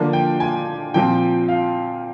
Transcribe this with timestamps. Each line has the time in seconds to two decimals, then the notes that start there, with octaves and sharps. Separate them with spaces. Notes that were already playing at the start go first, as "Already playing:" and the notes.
Already playing: D3 F3 A#3 D4
0.13 G5
0.40 G#5
0.94 A#2 F3 C4 G5
1.48 F5